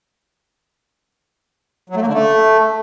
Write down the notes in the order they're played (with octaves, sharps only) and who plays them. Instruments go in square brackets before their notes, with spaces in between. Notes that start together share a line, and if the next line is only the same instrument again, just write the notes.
[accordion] F#3
A3
A#3
D3
A3